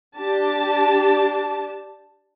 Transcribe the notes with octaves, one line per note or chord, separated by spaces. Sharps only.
D4 G4 A5